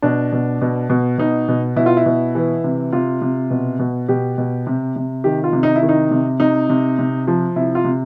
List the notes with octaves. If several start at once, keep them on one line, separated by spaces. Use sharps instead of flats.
B2 D4
B2
B2
B2
B2 D#4
B2
B2 E4
F4
E4
B2
E3
C3
C3 F4
C3
B2
B2
B2 G4
B2
C3
C3
D#3 G4
F4
C3
D#4
E4
D#3
D#4
C3
C3 D#4
C3
C3
F3
C3 E4
F4
C3